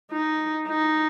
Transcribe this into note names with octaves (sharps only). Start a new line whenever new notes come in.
D#4
D#4